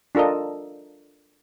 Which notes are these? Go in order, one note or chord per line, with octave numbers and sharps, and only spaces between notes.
D4 F4 A4 A#4 D#5